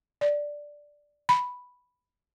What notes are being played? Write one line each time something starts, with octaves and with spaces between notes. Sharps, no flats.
D5
B5